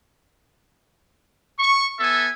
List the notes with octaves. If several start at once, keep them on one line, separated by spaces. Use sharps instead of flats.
C#6
B3 A4 E5 G#5